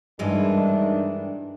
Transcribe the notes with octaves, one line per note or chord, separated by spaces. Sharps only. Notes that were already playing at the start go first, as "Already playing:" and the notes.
G2 D#3 E3 G#3 D4